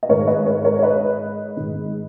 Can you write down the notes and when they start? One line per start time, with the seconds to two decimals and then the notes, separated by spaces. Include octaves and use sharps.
0.03 D#5
0.09 G#2 D#3 A#4 C#5
0.27 B4 D#5
0.46 A#4 C#5
0.64 A#4 C#5
0.79 C#5
0.83 B4 D#5
1.57 G#2 D#3